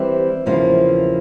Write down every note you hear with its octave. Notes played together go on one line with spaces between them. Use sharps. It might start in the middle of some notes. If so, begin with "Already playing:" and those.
Already playing: E3 G3 C4 E4
E2 C#3 F3 A#3 E4